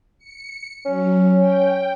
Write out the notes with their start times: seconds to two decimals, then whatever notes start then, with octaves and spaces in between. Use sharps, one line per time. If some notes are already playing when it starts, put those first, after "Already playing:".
0.19 C#7
0.86 F#3 C#4
1.40 G5